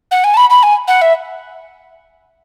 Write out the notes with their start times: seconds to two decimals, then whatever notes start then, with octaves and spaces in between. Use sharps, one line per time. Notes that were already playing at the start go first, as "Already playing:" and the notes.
0.11 F#5
0.24 G#5
0.34 A5
0.37 B5
0.50 B5
0.63 G#5
0.88 F#5
1.02 E5